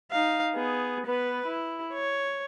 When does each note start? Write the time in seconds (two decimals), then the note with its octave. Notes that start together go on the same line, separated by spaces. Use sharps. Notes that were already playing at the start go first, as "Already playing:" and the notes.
0.12 D#4 F5
0.55 B3 G#4
1.06 B3 B4
1.46 E4
1.93 C#5